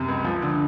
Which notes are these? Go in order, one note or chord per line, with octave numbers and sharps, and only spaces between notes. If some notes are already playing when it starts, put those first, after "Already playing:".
Already playing: F#2 C3
C#2
F3
D3